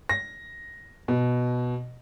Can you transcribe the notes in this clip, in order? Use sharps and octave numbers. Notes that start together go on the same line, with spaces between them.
A#6
B2